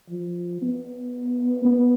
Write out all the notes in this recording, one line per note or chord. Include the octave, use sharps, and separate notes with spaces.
F3
B3
B3